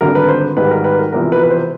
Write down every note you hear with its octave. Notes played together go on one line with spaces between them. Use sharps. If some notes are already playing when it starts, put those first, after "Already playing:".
G#1 G2 D3 A#4
B4
C5
G#2 D#3 G3 B4
A#4
B4
A#4
E1 E2 C3 F3 A#4
B4
B4
C5